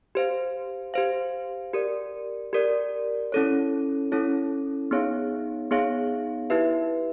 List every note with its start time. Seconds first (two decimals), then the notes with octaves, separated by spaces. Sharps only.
0.15 G4 C5 F5
0.94 G4 C5 F5
1.73 G4 A#4 D5
2.53 G4 A#4 D5
3.32 C#4 E4 A4 C#5
4.12 C#4 E4 A4 C#5
4.91 B3 D#4 G#4 C#5 F5
5.71 B3 D#4 G#4 C#5 F5
6.50 E4 G4 B4 E5